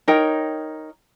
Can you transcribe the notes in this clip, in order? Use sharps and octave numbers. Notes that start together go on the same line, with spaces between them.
D#4 A#4 C#5 G5